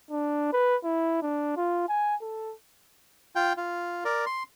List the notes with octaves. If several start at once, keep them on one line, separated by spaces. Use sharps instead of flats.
D4
B4
E4
D4
F4
G#5
A4
F4 G5
F4
A#4 D5
C6